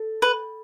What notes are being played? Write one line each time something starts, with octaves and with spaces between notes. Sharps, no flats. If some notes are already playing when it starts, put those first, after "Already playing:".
Already playing: A4
B4